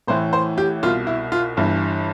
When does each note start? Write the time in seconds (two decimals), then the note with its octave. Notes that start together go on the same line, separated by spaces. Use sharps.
0.07 A1 A2 E3 C5
0.33 C5
0.58 G4
0.83 C2 B2 F4
1.07 E4
1.32 F4
1.57 G1 G2 E3